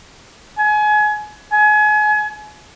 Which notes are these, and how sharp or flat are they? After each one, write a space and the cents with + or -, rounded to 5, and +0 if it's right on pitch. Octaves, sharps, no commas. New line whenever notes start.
G#5 +30
G#5 +30